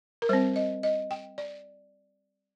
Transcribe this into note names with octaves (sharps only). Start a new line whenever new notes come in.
A#4
G3 C4 C5
D#5
D#5
G5
D5